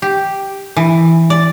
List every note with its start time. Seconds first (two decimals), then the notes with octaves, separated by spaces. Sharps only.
0.02 G4
0.77 E3
1.30 D5